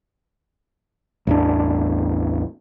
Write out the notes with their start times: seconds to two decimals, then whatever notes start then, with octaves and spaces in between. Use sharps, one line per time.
1.27 A1 E2 D4